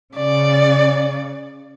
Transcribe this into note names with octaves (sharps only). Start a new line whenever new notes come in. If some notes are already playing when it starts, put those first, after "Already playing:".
C#3 D5